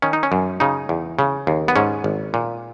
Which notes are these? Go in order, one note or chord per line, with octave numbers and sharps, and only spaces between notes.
D#3 C#4
D#4
C#4
F#2
C#3 D#4
E2
C#3
D#2
B3
G#2 C#4
G#1
A#2